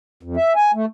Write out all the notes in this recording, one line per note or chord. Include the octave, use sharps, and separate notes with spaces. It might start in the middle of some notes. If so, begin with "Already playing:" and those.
F2
E5
G#5
A3